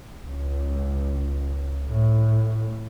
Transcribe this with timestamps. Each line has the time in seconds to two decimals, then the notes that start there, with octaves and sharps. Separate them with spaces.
0.25 C#2
1.90 A2